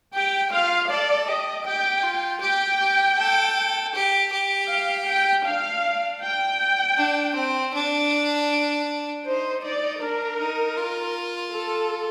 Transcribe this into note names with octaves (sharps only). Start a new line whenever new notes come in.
G4 G5
F4 F5
A4 D5
G4 D#5
G4 G5
F4
G4 G5
G4
A4
G4
G4
F5
G5
D4 F5
G5
D4
C4
D4
D#4 C5
D#4 D5
D4 A#4
D#4
F4
A4